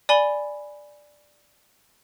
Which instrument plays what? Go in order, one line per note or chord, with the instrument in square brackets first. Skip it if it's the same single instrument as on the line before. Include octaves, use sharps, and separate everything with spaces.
[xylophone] D5 G#5 B5 G7